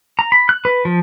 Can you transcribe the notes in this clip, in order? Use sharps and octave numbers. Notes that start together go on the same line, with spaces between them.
A#5
B5
F#6
B4
F3